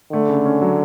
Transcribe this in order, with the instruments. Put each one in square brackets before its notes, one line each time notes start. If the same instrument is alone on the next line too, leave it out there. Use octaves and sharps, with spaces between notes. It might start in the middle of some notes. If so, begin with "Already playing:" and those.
[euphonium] D3 [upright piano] A3
[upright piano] C#3
C#4
F#3